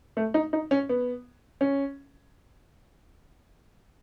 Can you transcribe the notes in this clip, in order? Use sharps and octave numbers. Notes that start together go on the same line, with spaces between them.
A3
D#4
D#4
C#4
B3
C#4